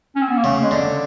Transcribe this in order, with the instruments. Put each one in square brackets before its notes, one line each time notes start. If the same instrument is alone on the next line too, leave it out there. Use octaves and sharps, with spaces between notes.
[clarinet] C#4
C4
B3
A#3
[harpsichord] C#3 [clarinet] A3
[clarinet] G#3
[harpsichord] D3